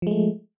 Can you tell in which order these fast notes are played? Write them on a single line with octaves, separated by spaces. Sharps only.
F3 G#3 A3